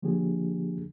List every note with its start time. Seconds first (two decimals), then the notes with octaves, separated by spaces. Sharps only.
0.03 D3 F3 A#3 D4 G4 G#4